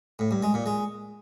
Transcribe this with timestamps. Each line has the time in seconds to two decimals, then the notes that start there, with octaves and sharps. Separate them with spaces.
0.19 A2
0.31 G2
0.43 G#3
0.54 A#2
0.66 G#3